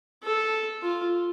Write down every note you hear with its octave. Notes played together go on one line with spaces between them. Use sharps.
A4
F4